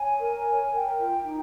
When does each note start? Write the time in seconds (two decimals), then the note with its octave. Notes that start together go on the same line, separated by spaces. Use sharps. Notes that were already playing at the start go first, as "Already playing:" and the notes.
Already playing: C#5 G#5
0.19 A#4
0.46 C#5
0.72 A#4 G5
0.98 F4
1.24 D#4